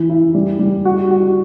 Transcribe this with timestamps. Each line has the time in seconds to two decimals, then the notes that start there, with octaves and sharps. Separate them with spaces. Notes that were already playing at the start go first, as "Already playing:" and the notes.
Already playing: E3
0.09 E4
0.35 G3
0.59 G3
0.85 F#4
1.11 F#4